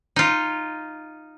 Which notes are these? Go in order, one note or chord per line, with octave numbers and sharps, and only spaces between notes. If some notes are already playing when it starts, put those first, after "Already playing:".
D#4 F4